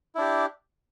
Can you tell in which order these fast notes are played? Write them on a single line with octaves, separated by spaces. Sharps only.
E4 D4 G4